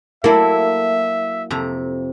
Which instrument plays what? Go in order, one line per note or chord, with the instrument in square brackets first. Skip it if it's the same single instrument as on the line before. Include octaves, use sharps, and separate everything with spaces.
[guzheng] F#3 A4 D5 [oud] A#3 E4 [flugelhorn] E5
[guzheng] F2 C3 A#5